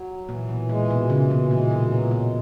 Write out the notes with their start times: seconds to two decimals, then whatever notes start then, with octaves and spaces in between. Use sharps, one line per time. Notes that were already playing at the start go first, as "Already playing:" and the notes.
Already playing: F#3
0.29 A#2 E3
0.49 B2
0.69 A#2 G#3
0.91 B2
1.10 C#3 E3
1.31 B2
1.51 A#2 G#3
1.71 B2
1.91 A#2 F#3
2.11 B2